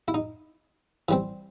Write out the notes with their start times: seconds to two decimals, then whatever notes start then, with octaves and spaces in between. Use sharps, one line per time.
0.08 E4
0.14 D#4
1.09 E3 G3 C4